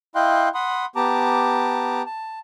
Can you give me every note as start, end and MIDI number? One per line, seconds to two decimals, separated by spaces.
0.15 0.49 64
0.15 0.49 75
0.15 0.49 77
0.15 0.49 79
0.15 0.49 84
0.15 0.49 90
0.54 0.85 78
0.54 0.85 83
0.54 0.85 84
0.54 0.85 87
0.96 2.02 59
0.96 2.02 67
0.96 2.02 81
0.96 2.02 82
0.96 2.02 86
2.06 2.39 81